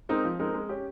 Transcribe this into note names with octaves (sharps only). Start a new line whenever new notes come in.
G#3 C4 D#4 A#4
F3
G#3 C4 D#4 A#4
G#3
C#4 G4